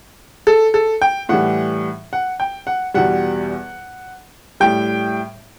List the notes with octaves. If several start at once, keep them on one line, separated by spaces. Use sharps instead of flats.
A4
A4
G5
A2 E3 G3 F#5
F#5
G5
F#5
E2 B2 G3 F#5
A2 G3 G5